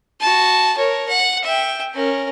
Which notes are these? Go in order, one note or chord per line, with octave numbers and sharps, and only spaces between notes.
F#4 A5
A#4 C#5
F#5
E5 G5
C#4 A#4